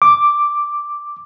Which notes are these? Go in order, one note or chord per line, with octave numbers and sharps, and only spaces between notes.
D6